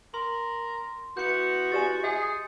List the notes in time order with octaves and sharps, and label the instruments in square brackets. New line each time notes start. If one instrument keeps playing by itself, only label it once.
[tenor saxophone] A#4 [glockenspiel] C6
[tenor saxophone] B3 [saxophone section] E4 F#4 [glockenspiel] G6 C#7
[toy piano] G4 D5 G#5 [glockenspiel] A6 E7
[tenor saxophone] G#4 [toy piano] D#5 G#5